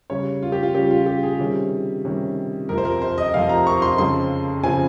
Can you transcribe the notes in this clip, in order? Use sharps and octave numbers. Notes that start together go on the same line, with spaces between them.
C#3 G3 C#4 C#5
F4
G4
F4
C#3 G3 C#4 G4
F4
G4
G#4
C3 D#3 G3 C#4
C3 D#3 G3 C#4
F2 C3 F3 A#4
C5
A#4
C5
D#5
F2 C3 F3 F5
A#5
C#6
C6
F2 C#3 F3 C4 C6
C#3 F3 C4 G#5